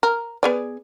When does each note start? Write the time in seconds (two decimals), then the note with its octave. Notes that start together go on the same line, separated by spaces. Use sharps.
0.03 A#4
0.43 B3 G#4 D5